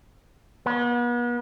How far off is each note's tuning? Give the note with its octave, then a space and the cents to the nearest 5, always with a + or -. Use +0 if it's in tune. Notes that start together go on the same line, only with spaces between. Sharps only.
B3 -40